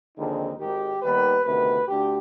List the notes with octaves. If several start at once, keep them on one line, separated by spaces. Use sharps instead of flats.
D#2 D3 F3 G#3 C4 D#4
G#1 G#2 D#3 G4
D#2 D#3 G3 B3 B4
D2 C3 D#3 B3 B4
D2 D3 G4